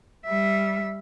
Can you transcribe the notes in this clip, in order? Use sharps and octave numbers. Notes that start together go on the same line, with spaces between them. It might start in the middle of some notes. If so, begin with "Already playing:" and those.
G3 E5